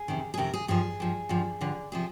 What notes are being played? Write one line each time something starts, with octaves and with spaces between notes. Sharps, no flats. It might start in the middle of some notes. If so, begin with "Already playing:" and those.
Already playing: G#4
F2 C3 D#3
G#4
F2 C3 D#3 A#4
G#4
G2 F3 G#4
G2 F3
G2 D3 F3
G2 D3 F3
C3 F3 G#4